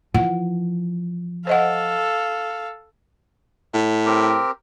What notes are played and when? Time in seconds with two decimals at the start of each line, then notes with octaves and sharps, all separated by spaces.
0.14 E3 F3 F#5
1.47 A4 C5 D#5 F5 F#5
3.74 A2
4.06 C4 G4 A#4